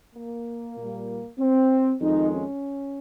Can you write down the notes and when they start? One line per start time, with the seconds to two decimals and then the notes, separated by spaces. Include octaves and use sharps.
0.15 A#3
0.78 A#2 G3
1.39 C4
2.01 F2 D#3 G#3 D#4
2.32 C#4